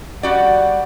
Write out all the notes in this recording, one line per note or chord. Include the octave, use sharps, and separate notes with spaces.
G3 F#4 D5 F#5